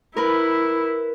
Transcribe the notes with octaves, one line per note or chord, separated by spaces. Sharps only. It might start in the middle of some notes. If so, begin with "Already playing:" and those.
E4 A#4 B4